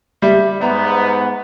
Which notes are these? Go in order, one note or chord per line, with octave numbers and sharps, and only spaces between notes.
G3 E5
G#2 B3 A#5